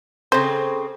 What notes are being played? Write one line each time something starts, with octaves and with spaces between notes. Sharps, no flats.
C#3 C4 A4 C5